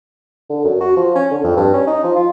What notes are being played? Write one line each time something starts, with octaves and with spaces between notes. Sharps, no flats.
D3
F#2
F#4
F3
C#4
D3
F2
G2
C#4
D#4
F3
F4